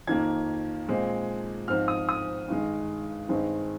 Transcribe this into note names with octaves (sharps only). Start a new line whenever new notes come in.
F2 D#3 A#3 G#6
A#2 G#3 C4
G#2 F3 C4 F6
D#6
D#6
G2 D#3 G#3
G2 D#3 G#3 C4